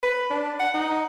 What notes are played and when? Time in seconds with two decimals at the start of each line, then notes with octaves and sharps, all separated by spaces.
0.03 B4
0.30 D4
0.60 F#5
0.74 D#4